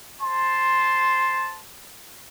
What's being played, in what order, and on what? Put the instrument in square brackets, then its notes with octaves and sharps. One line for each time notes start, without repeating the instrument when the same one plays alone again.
[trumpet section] C5 A5 C6